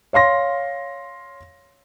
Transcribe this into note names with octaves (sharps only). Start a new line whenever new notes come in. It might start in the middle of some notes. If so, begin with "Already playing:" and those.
C#5 F5 C6 A#6